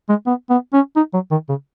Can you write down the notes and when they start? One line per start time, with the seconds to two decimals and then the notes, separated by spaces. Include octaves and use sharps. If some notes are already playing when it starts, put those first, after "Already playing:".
0.09 G#3
0.27 B3
0.50 B3
0.73 C#4
0.96 D#4
1.14 F#3
1.31 D#3
1.49 C#3